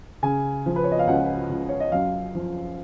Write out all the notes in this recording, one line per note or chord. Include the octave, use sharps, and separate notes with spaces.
C#3 G#5
F3
B4
C#5
D#5
F5
C#2 F#5
C#2
C#5
D#5
F#2 F5
F3